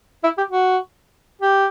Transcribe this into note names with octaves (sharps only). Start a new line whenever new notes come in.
E4
G4
F#4
G4